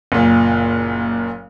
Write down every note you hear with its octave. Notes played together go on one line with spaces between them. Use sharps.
F#1 A#2